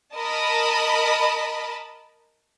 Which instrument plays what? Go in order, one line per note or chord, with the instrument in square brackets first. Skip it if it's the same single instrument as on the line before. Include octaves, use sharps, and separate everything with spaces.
[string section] A#4 D#5 A5 B5